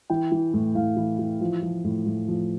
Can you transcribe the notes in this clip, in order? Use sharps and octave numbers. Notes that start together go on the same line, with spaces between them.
E3 G5
E3
A2
A2 F5
E3
E3
F3
F3
A2
A2
F3